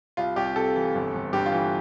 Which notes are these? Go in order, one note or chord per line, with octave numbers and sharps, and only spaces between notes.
C2 F4
C2 G4
C3 A4
E3
G1
G1
G2 G4
F4
E3